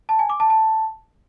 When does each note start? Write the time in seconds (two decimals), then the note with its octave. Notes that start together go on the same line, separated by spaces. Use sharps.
0.09 A5
0.19 G#5
0.29 D6
0.40 A5
0.50 A5